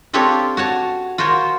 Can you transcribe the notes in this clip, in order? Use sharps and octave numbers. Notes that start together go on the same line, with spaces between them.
C4 D4 F4 G4 A4 C#5
F#4 C#5 A5
F4 F#4 A#4 C5 C#5